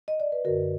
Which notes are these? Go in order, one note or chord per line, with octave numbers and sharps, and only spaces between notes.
D#5
D5
B4
F#2 D3 F#4 A#4